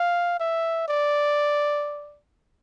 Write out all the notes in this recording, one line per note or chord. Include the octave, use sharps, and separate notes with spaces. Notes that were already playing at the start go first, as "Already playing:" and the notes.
Already playing: F5
E5
D5